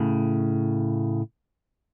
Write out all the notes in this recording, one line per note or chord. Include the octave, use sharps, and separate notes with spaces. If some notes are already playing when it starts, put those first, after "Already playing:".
Already playing: A2 C#3